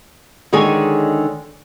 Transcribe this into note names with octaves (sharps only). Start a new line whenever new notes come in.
D3 D#3 G#3 G#4 C#5 G#5